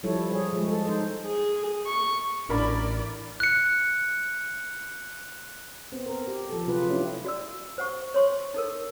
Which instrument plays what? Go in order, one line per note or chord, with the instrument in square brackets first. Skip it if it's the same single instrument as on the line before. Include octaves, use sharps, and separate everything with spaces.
[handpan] F3 G3 E4 A4 C#5
G#4 C#5
F3 G#3
A4
D#4 C5
[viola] G#4
C#6
[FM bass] A1 [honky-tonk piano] D4 A#4 B5 [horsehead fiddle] E4 D5
[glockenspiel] F#6 C#7
[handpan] B3 C4
A#4
G4
F3 A4
C3 F#3 F4 G#4 B4
A3 C#4 D4 E4 G4
[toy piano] F#4 D5 E6
C5 F#5 C#6
C#5 C6 C#6
D#4 A4 A#4